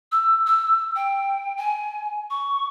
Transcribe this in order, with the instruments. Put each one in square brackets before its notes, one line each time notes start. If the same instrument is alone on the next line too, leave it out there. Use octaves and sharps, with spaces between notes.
[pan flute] E6
E6
G5
G#5
C#6